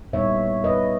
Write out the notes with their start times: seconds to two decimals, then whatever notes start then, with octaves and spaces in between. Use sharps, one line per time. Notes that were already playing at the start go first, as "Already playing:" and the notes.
0.13 A#2 G3 B3 D#4 C#5 E5
0.64 B4 D#5